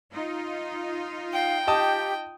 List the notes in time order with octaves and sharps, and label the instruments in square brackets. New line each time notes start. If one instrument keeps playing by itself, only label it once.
[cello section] D#4 F4
[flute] F5 [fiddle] G5
[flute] G4 [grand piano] D#5 A5 D#6